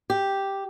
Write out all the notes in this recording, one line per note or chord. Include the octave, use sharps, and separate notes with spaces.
G4